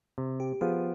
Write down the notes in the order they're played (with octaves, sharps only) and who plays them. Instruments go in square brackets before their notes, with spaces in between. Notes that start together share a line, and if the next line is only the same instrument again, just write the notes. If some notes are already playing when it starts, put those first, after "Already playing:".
[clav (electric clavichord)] C3
[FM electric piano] G4
[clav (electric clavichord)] F3 B3 F4 [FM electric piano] G#4